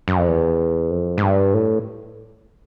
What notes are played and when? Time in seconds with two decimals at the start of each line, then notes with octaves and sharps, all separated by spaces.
0.08 F#2
0.18 F2
0.28 E2
0.91 F2
1.18 G#2
1.22 G2
1.54 A2